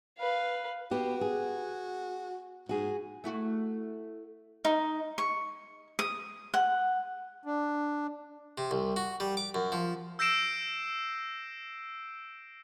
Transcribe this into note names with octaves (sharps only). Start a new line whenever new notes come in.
B4 F5
B3 F#4 G4
G#4
G#2 F#4 G#4
A3 E4 F#4
D#4
C#6
D#6
F#5
D4
C3
C2
F#4
G3
D6
F#2
F3
E6 G6 A#6 C7 D7 E7